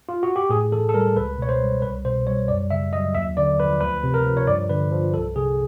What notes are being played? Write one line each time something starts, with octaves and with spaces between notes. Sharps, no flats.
F4
F#4
G4
A2 G#4
E3 A4
A4
G3 A#4
C#2 B4
B2 C#5
C5
G3
C2 B4
B2 C5
G3 C#5
F#2 D5
C#3 E5
F#3 D#5
D#2 E5
D3 D5
F3 B4
D2 B4
C3
A#4
F3
C#5
G2 D5
D3 B4
F3
C2 A4
C3 G#4